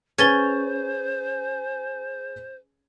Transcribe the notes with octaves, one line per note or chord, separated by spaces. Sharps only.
C#4 G#4 B4 C5 G#5 G#6 A6 G7